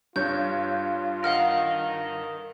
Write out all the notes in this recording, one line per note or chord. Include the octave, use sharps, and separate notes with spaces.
G2 F4 C#5 G6
A#4 D#5 F5 F#5 F6